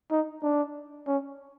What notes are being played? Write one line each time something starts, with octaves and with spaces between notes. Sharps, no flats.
D#4
D4
C#4